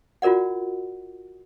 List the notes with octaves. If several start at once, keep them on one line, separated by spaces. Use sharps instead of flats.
F4 F#4 A#4 D5 F#5